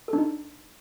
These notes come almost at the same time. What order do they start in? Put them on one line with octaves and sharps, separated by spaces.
A4 D4 D#4